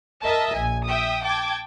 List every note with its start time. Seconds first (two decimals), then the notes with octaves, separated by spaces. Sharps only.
0.24 A#4 D#5 E5 A5
0.56 A#1 G#5
0.86 E5 G5 D#6
1.24 G5 A5 D6 G#6